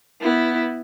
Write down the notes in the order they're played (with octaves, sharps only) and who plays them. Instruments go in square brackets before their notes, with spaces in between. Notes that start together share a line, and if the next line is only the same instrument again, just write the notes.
[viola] B3 E4